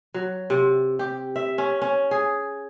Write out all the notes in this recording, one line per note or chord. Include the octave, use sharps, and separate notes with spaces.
F#3
C3
G4
E5
C#4
C#4
G#4